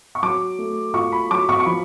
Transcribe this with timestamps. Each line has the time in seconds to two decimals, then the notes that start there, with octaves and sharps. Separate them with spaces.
0.15 C#6
0.23 F#3 D6
0.59 A3
0.94 F4 C#6
1.12 B5
1.31 F#3 D6
1.49 C#6
1.60 C#6
1.66 F3 B5